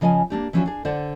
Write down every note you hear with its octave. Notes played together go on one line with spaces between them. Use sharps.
C#3 F3 D#5 G5 G#5
A#3 C4 D4 G4
E3 F3 C#4 D4 E4 F#4
D4 G#4
D3 C5 D5 F#5